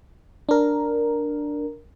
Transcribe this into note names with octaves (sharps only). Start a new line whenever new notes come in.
D4 A#4